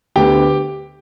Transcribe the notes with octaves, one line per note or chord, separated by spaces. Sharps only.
D2 D3 B3 G4 G5